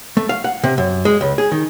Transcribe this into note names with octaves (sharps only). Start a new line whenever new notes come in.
A3
F5
F#5
C3
F#2
G#3
C#2
G#4
D#3